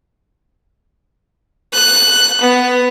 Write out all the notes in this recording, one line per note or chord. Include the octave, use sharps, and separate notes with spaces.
F#6
B3